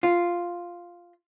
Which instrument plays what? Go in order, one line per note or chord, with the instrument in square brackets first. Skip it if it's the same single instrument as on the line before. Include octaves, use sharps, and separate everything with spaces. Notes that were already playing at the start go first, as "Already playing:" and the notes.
[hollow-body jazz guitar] F4